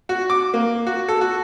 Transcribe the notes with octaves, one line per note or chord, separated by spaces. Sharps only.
F#4
D6
A#3
F#4
A4
F#4